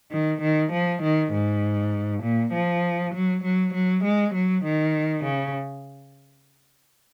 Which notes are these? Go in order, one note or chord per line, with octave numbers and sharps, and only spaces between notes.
D#3
D#3
F3
D#3
G#2
A#2
F3
F#3
F#3
F#3
G#3
F#3
D#3
C#3